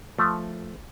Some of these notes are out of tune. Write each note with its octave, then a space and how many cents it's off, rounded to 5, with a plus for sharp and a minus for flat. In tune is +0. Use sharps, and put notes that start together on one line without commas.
F3 +0 A3 +0